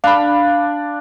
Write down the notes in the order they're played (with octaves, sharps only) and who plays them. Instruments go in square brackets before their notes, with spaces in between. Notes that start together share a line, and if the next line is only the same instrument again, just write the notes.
[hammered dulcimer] D4 [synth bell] F5 B5